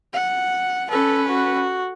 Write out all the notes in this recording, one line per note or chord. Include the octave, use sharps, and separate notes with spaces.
F#5
C#4 A4 B4
F#4